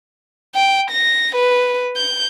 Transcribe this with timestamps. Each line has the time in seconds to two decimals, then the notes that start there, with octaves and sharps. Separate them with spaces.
0.55 G5
0.91 A#6
1.36 B4
1.96 G6